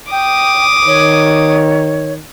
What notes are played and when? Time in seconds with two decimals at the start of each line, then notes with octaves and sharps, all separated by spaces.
0.11 G5 D6 D#6
0.87 D#3 C#5